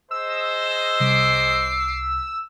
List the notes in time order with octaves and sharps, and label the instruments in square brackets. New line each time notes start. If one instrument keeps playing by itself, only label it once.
[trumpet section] G#4 C5 D#5 [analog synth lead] E6
[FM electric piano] C2 B6 [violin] D6 C7